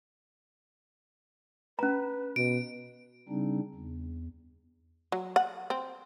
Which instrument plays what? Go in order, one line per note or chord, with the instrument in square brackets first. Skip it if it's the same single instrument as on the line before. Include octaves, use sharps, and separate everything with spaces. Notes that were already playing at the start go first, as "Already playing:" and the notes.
[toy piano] C#4 A#5 [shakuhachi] B4
[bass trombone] B2 [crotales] D7
[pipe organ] C#3 G3 C4 D4 D#4
E2
[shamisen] F#3
F#5
C4